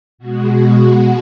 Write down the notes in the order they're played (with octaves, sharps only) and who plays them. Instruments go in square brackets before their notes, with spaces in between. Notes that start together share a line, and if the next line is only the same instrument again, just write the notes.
[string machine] B2 G#3 F#4